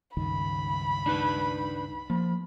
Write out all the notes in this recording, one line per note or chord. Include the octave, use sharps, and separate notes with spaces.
C#2 G2 D#3 B5
D4 D#4 B4
F3 A#3